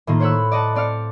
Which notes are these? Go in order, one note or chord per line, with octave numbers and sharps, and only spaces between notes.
A2 D#3 A#3 F4
C5 C#5 F#5 B5 E6
D5 D#5 F#5 A5
C4 D5 F5 F6 C#7